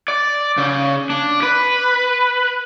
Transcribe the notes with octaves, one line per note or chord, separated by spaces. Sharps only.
D5
C#3
D4
B4